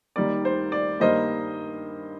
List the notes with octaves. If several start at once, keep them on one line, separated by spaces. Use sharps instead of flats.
D#2 D#3 G3 A#3 D5
C5
D5
G2 D#3 G3 A#3 C5 D#5